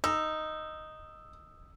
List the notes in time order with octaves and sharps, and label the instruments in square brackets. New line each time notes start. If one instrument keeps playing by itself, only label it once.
[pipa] D#4 [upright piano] E6